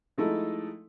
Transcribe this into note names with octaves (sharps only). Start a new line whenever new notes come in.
F3 G#3 A3 D#4 E4 A4